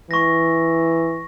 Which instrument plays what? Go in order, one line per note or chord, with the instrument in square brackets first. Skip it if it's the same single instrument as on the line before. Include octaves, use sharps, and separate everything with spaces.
[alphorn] E3 [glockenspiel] C#6 A#6